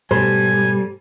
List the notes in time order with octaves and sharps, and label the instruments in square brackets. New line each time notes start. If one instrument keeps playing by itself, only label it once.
[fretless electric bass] G#2 B2 A3 [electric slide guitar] G3 [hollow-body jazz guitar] A4 C5 [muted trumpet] G#5